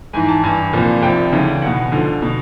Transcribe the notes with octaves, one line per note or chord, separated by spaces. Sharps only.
G#2 E3 G#5
A5
G2 E3 G#5
C2 A#2 F3
C2 C3 F3 G5
D2 C#3 E3
E2 B2 F#5
D2 D3 F3
B2